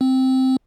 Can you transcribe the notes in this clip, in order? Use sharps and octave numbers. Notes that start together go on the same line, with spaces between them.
C4